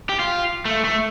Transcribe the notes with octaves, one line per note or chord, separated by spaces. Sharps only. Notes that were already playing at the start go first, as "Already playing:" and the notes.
G4
F4
A3
A3